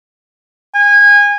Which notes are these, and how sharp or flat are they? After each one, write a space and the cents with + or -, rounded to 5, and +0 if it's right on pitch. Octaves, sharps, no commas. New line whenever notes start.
G#5 -25